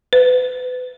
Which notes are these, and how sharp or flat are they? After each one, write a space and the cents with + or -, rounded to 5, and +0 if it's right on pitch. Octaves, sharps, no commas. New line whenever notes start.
B4 +35